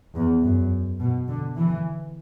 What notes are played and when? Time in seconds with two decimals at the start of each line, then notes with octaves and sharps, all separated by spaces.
0.15 E2
0.43 F#2
1.00 B2
1.28 D3
1.57 E3